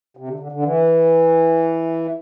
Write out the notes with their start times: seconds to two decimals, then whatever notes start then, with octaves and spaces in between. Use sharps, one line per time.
0.17 C3
0.28 D3
0.40 D3
0.52 D3
0.63 E3